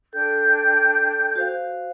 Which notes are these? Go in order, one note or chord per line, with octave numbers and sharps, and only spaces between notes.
D4 A4 G5 G6
F#4 C5 F5